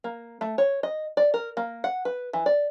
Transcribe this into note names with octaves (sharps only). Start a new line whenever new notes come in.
A#3
A3
C#5
D#5
D5
A#4
A#3
F#5
B4
E3
D5